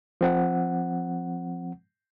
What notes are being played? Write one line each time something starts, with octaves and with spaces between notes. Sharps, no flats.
F3 C4 F#5